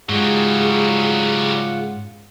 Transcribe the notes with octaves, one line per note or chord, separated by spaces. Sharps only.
G#2 C#3 F#3 G3 F4 G#4 F#5